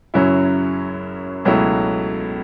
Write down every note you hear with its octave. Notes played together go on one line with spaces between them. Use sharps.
F#2 C#3 F#3 C#4 E4
C#2 B2 F#3 A3 E4